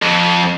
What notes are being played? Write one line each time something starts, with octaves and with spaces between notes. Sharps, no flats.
F2